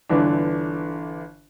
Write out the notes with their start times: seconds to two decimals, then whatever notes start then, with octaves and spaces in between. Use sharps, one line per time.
0.09 G1 D3 E3 D4